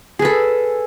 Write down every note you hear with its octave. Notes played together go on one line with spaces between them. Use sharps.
G#4 A4 B4